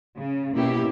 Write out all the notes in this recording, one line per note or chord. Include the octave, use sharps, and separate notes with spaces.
C#3
B2 A#3 C#4 E4 G4